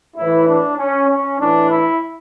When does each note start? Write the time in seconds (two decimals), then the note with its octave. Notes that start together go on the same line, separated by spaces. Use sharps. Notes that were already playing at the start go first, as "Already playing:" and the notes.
0.16 A2 E3 E4
0.47 D4
0.77 C#4
1.09 C#4
1.39 A2 E3 D4
1.70 E4